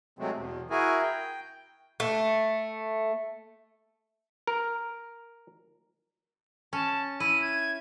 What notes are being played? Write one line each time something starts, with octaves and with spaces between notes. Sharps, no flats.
C3 F#3 G#3 A3 C4
E2 B2
E4 F#4 G#4 A#4 G#5
G5
A3
A#4
C#4 A5
E4 D#7
G#6